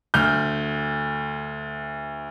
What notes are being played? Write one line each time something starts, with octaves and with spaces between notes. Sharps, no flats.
D2 F6 G6